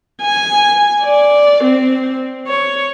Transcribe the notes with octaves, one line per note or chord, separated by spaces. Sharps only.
G#5
D5
C4
C#5